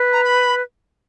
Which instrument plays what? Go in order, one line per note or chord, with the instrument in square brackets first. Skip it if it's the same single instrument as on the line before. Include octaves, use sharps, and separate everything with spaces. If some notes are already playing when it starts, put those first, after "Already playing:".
Already playing: [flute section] B4
[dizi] A#5
B5